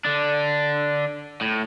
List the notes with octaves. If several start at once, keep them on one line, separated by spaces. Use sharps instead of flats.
D3 D4
A2